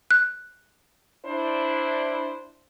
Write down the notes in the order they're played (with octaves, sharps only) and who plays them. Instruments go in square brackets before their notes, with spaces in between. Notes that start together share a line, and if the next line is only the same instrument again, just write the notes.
[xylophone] F#6
[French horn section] D4 E4 C5